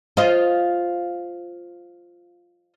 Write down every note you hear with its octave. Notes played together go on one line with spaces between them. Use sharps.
F4 C5 D#5